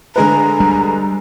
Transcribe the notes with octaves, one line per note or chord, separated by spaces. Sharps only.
D3 G#3 B4 A#5
G3